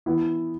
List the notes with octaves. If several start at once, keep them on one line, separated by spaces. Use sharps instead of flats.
E3 B3 E4